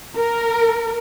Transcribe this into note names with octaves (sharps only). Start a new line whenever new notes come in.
A#4